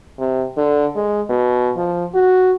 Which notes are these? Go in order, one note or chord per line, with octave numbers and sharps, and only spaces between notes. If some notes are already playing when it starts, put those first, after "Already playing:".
C3
D3
G#3
B2
F3
F#4